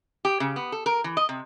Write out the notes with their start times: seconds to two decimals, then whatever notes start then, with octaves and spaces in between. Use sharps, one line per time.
0.25 G4
0.40 C#3
0.56 B3
0.72 A4
0.86 A#4
1.04 E3
1.17 D#5
1.29 C3